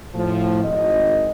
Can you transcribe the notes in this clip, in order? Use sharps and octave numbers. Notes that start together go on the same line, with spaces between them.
A2 F3
G#1 D#5